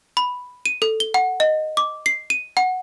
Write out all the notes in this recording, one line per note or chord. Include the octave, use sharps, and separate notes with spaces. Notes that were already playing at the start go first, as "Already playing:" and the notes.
B5
D#7
A4
G7
F#5
D#5
D6
C7
D#7
F#5